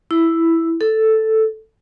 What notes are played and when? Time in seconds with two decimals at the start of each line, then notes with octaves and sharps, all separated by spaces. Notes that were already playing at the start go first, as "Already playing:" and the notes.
0.11 E4
0.81 A4